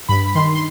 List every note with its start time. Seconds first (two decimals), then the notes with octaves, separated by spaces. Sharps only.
0.09 G2 B5
0.26 B5
0.35 D#3 C6
0.55 C6